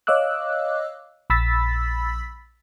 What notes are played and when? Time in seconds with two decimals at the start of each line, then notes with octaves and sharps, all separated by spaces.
0.07 C#5 D#5 F5 D6 E6 F#6
1.30 A#1 B5 E6 A6 B6